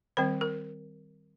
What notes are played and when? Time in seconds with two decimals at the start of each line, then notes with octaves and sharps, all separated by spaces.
0.17 D#3 G3 C4 C5
0.41 A#4